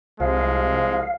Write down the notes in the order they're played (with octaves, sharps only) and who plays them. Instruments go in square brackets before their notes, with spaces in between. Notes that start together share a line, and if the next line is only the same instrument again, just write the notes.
[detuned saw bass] C2 [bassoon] F3 [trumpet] G#3 [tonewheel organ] F5